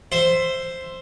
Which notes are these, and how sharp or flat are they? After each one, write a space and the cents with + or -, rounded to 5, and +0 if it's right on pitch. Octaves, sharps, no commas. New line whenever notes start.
C5 +0 E5 +15